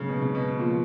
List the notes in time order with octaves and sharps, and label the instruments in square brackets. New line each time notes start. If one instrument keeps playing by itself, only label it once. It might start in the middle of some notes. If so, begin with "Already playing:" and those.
Already playing: [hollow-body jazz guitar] G#2 F#3 A#3 [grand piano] C#3
[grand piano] B2
C#3
B2
[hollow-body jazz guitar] F2 F3 A#3